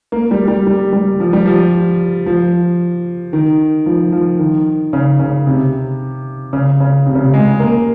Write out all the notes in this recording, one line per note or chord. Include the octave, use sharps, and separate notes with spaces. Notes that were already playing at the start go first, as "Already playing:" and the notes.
A#3
G3
G3
G3
G3
F3
G3
F3
F3
D#3
F3
F3
D#3
C#3
C#3
C3
C#3
C#3
C3
C#3
C3
G#3
A#3